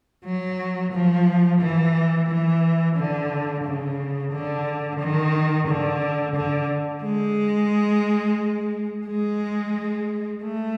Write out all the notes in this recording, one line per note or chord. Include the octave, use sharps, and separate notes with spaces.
F#3
F3
E3
E3
D3
C#3
D3
D#3
D3
D3
G#3
G#3
A3